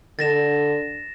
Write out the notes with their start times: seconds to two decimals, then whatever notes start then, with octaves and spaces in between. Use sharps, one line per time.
0.19 D3 A6 A#6 E7